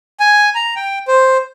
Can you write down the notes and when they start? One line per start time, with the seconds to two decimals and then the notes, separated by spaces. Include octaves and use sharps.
0.20 G#5
0.55 A#5
0.76 G5
1.08 C5